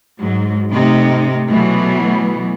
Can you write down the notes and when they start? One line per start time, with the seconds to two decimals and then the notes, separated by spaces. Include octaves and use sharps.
0.20 G#2 F#3
0.72 C3 A3 D#4
1.50 B2 E3 F#3 A3 B3